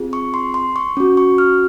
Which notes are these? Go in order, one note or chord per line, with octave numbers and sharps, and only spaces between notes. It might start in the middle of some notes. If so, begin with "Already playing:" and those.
Already playing: C4 F4 G#4
C#6
C6
C6
C#6
C#4 F#4
C#6
F6